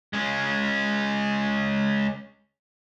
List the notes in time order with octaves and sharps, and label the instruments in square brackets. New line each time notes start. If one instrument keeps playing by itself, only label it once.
[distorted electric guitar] G#3 C#4